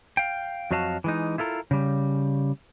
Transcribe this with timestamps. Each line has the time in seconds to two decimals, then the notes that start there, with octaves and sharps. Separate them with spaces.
0.17 F5 G5
0.71 F2 F#3 F#4 D#5 F5 A5
1.04 E3 G#3 D#4
1.38 E4 F4 A4 A#4
1.71 C#3 G3